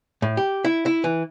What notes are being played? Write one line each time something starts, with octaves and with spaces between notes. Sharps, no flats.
A2
G4
E4
E4
E3